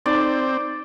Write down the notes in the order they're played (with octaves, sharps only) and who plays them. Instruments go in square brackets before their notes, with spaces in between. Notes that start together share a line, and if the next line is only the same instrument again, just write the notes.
[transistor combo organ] C4 [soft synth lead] D#4 [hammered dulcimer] D5